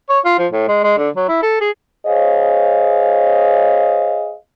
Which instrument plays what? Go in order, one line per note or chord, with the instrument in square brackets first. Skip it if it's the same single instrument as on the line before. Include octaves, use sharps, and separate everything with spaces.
[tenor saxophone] C#5
F4
F3
A2
G#3
G#3
D3
F#3
E4
A4
G#4
[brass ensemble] G#4 C5 C#5 D#5 F5